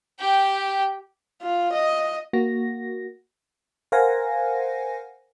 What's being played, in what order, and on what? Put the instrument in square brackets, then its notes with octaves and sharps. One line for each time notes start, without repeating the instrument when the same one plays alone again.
[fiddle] G4 G5
[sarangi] F4
D#5
[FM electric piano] A#3 F#4 A#6
A#4 C5 F5 F#5 G#5 A#6